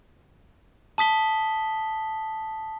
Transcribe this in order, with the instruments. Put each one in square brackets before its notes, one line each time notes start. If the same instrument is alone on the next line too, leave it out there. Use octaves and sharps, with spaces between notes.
[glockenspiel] A5 D#6 B6 G7